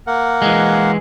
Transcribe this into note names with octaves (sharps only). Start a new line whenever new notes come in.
A#3 A#4 F#5
E3 G#3